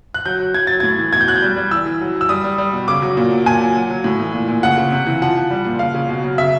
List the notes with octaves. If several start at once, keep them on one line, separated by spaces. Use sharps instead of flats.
F#6
F#3 G6
F#3
F#3 G#6
F#3 A6
A2 G#6
E3
B2 G#6
G6
F#3 F#6
G6
G3
G3
E3 E6
E3
F#3
F#3
E6
G3 D#6
G3
G3
B2
C#3 D6
F#3
A#2
F#3
A#2 G#5
F#3
F#3
F#3
A2
E3
A#2
A#2
C#3 F#5
C#3
C3
E3
F3 F#5
F3
G3
A#2
C#3 F5
C#3
B2
F#3
C#3 E5